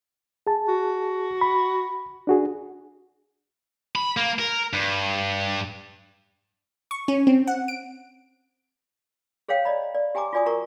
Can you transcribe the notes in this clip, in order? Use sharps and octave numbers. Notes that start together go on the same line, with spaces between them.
G#4 A5
F#4
B5
D4 F#4 G#4
B5
A#3
A#4
G2
C#6
C#4
C4
F#5
D7
G#4 C5 C#5 F5 G5
D5 D#5 A#5 B5
D5
G4 G5 G#5 A#5 D6
F4 F#4 D5 G#5 D#6
F#4 A#4 A#5 C#6